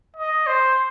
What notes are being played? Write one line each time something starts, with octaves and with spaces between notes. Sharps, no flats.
D#5
C5